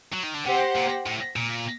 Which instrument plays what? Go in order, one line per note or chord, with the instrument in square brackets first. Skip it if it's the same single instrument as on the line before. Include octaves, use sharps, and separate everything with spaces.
[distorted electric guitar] F#3
D#3
D3
[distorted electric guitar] C3 [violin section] G4 C5 F#5
[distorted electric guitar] A#2
A2
A#2